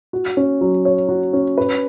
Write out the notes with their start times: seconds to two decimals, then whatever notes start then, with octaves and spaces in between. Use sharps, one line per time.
0.13 F#4
0.37 C#4
0.61 F#3
0.85 C#5
1.09 F#4
1.33 C#4
1.58 B4